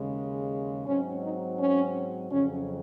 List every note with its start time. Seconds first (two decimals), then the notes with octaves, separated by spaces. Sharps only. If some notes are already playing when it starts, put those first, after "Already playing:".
Already playing: D#2 C#3 G#3
0.86 G#2 F#3 C4 C#4
1.22 D#4
1.58 C#4
2.31 F2 C#3 F#3 C#4